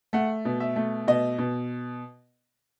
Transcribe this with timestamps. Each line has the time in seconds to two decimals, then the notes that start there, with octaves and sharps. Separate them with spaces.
0.13 A3 F#5
0.45 B2
0.60 E5
0.76 A3
1.07 B2 D#5
1.38 B2